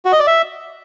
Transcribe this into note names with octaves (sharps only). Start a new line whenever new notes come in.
F#4
D#5
D5
E5